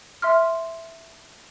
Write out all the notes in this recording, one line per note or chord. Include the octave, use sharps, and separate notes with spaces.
E5 C6 F6